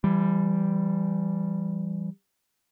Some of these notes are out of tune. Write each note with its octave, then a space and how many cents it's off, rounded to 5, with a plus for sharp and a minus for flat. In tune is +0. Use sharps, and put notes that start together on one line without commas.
E3 +35 G3 +0